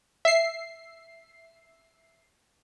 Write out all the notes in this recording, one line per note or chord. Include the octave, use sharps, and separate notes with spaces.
E5 C7